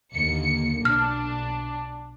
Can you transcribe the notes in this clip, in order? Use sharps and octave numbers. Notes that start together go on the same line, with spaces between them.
D#2 D3 A#3 C#7
B1 D4 F6